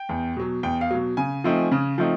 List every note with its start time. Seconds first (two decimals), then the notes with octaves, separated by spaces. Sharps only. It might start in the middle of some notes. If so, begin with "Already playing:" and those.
Already playing: G5
0.09 E2
0.37 B2 F#3
0.63 E2 G5
0.81 F5
0.91 B2 F#3
1.17 C#3 G#5
1.44 F3 A3 C4 D#4
1.72 C#3
1.98 F3 A3 C4 D#4